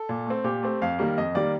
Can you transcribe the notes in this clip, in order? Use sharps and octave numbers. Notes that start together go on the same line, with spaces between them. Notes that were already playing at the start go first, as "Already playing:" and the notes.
Already playing: A4
A#2
A3 C4
A#2 G4
A3 C4
F2 F5
D#3 G3 A#3
F2 D#5
D#3 G3 A#3 D5